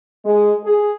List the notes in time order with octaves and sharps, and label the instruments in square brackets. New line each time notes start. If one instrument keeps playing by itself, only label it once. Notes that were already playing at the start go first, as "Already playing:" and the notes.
[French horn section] G#3
G#4